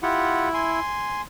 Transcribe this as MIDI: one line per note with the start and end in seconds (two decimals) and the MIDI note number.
0.03 0.80 64
0.03 0.49 65
0.03 0.49 67
0.03 0.49 78
0.54 1.22 80
0.54 1.22 84